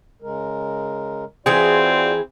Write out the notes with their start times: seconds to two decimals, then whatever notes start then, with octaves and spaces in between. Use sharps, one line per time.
0.22 C#3 G#3 A#4
1.46 E3 C4 F4 F#4 G#4 D5